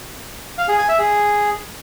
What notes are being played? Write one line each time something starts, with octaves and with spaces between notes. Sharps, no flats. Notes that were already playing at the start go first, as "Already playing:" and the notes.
F5
G#4
G#5
E5
G#4